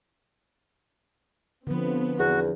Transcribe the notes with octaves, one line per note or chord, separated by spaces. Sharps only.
D3 F3 B3 C4
E2 F#4